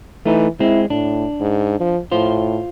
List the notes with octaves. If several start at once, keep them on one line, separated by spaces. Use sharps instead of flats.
E3 A3 D#4
G#3 C4 E4
A2 D4
G#2
F3
A2 F4 C5